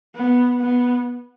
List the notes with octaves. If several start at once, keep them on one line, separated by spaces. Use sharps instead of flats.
B3
B3